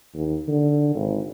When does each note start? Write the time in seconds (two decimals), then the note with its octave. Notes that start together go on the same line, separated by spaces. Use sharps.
0.15 D#2
0.48 D3
0.95 G#1